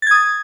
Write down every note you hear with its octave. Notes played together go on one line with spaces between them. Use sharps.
D#6 G#6 A6